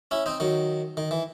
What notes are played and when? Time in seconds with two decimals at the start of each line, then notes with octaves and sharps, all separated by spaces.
0.11 C#4 E4
0.26 C4 D#4
0.40 D#3 F#3
0.97 D#3
1.11 E3